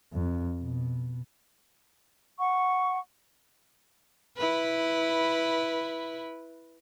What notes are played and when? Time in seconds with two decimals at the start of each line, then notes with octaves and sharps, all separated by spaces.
0.13 F2
0.60 B2
2.38 F#5 C#6
4.37 E4 B4